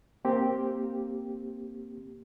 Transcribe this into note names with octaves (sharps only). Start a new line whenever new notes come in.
A#3 C4 G4